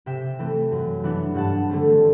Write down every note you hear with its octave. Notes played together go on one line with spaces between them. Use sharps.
C3 E5 G5
E3 A3 C4
F#2
E3 B3 D4
G2 F#5 A5
D3 A3 C4